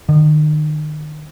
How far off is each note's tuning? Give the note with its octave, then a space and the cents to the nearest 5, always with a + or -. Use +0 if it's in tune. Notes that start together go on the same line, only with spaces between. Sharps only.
D#3 -35